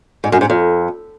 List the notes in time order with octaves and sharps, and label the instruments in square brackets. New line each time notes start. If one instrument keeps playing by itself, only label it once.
[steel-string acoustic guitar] G#2
F#2
G#2
F2